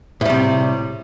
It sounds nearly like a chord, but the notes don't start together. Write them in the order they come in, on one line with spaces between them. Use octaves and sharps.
A2 G3 C3